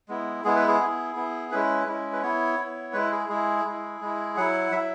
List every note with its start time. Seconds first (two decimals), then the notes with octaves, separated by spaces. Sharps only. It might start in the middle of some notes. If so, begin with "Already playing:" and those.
0.09 G#3 B3 E4
0.44 G#3 B3 E4 G#4
0.56 B4
0.68 G#4
0.80 B3 E4
1.16 B3 E4
1.51 G#3 C#4 E4 B4
1.87 G#3 C#4 E4
2.13 B4
2.22 B3 E4 C#5
2.59 B3 E4
2.93 G#3 E4 B4
3.12 G#4
3.29 G#3 E4 G#4
3.65 G#3 E4
4.01 G#3 E4
4.37 F#3 E4 F#5
4.72 F#3 E4 E5